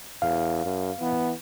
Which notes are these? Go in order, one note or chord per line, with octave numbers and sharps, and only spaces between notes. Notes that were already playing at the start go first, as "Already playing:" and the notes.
E2 F5
F#2
E3 B3